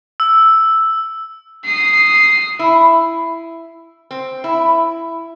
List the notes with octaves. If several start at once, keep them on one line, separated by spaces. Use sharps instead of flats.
E6
D#6 C7
E4
C4
E4